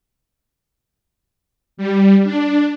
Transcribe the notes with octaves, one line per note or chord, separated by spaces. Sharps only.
G3
D4